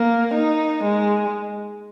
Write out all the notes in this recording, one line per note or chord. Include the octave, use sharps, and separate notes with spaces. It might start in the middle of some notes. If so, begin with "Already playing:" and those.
Already playing: A#3
D#4
G#3